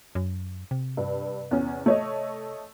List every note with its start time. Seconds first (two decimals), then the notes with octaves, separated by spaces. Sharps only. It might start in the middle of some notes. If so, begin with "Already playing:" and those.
0.15 F#2
0.71 C3
0.97 G2
1.51 E2 C#4
1.86 A3 C#5 D#5